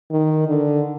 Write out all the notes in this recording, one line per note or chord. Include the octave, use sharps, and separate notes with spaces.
D#3
D3